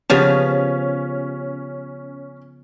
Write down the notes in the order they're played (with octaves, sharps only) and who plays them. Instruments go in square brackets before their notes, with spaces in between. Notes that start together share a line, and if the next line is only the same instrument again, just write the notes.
[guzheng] C#3 F3 B3 [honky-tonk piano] C#4 [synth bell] G4 C#5 F7